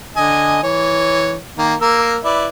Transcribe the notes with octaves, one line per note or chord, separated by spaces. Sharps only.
D3 D#5 G#5
E3 C#5
D#3 A#3
A#3 A#4 E6
E4 B4 D5